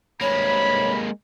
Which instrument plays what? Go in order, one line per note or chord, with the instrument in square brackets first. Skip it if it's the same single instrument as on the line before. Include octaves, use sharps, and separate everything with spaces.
[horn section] G2 C3 B5 [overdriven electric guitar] G#3 A#3 [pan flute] C#5